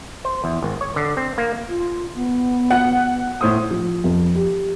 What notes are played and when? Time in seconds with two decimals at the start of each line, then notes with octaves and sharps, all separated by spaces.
0.25 C5
0.44 E2
0.62 G#1
0.81 C#5
0.96 D3
1.17 C4
1.38 A#3
1.69 F4
2.15 B3
2.71 F#5 F#6
3.41 A2 C5 D#6
3.70 F3
4.04 F2
4.35 G4